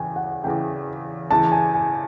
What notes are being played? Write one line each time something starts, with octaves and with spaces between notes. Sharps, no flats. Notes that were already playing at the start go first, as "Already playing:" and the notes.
Already playing: E2 C#3 E3 G5 G#5
F#5
E2 C#3 E3 G5
E2 C#3 E3 A5
G#5
G#5